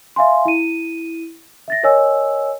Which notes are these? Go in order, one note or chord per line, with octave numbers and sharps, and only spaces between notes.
E5 F5 G#5 C6
E4 D#7
E5 A6 A#6
A#4 C#5 D#5 G#5 E6